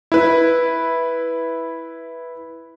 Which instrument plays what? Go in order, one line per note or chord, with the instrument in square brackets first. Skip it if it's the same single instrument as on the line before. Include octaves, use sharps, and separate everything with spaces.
[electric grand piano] E4 B4